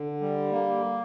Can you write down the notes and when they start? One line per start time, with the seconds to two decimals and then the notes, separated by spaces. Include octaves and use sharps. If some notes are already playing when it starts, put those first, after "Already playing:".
Already playing: D3
0.21 G3
0.51 A#3